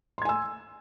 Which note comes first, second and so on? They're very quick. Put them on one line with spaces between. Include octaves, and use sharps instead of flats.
C6 G#6 G#5 E6